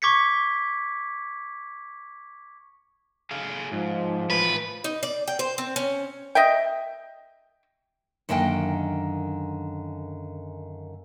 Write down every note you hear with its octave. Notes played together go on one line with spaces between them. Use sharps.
C#6 D6 G#6 B6 C#7
G#4 A4 F5
G#2 F3
A2 E3 F4 B4
D#4
D5
G5
C5
C4
C#4
D#5 E5 G5
F#2 D3 D#3 A#3 D#5 G5